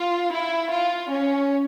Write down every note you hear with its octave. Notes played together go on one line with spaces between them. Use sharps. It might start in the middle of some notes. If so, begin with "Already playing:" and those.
Already playing: F4
E4
F4
C#4